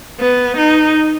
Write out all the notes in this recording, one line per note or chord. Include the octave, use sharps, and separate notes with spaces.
B3
D#4